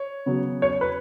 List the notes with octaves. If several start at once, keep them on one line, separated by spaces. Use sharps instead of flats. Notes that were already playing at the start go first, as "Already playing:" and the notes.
Already playing: C#5
C#3 F#3 B3
C#5
B4